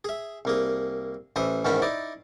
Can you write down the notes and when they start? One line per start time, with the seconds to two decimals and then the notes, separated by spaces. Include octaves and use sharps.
0.05 G#4 E5
0.45 C2 A#3 G#4
1.36 A1 E3 C5 E5 D#6
1.65 E2 G#2 D#3 C#4 C5 B5
1.82 D#4 E4 D5